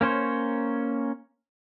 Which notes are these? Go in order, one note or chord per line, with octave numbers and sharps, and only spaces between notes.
A#3 C#4 C5 C#5